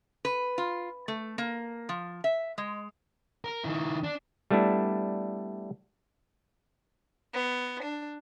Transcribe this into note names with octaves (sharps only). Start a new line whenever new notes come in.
B4
F4
A3
A#3
F3
E5
G#3
A#4
D#3 E4
D4
G3 A3 B3 D4 E4
B3
D4